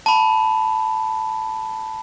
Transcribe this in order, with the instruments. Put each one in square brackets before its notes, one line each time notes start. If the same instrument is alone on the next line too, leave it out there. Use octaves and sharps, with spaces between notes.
[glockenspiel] A5 B5